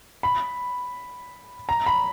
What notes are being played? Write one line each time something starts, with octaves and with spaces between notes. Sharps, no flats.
B5
A#5
B5